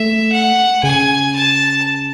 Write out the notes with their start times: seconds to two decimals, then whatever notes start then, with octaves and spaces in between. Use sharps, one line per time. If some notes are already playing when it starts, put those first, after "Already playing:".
Already playing: A3 E5
0.32 F#5
0.83 C#3 G#5
1.35 A5